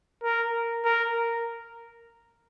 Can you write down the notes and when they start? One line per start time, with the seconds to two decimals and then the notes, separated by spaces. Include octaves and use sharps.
0.23 A#4
0.85 A#4